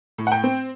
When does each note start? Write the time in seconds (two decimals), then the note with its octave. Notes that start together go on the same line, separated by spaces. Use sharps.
0.18 A2
0.27 F#5
0.32 G5
0.44 C4